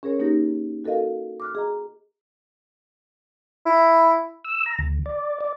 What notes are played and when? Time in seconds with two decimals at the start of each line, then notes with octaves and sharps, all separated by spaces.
0.03 C#4 G#4 A#4 C#5
0.20 A#3 D#4 G4 A#6
0.84 F#4 A4 A#4 D#5 F5
1.40 D6 F6 F#6
1.55 G#4 D#5 A#5
3.65 E4
4.44 E6
4.66 A#5
4.79 D2
5.06 D5
5.40 D5